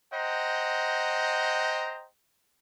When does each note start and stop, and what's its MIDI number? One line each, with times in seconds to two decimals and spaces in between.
0.13 2.07 72
0.13 2.07 75
0.13 2.07 78
0.13 2.07 79
0.13 2.07 82